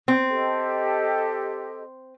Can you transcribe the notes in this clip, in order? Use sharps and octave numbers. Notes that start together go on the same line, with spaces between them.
C4
G4 A4 D#5